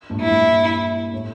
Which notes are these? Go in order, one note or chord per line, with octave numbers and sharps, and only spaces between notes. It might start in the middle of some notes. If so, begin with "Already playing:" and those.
G2 A#2
E4
G2 A#2
A2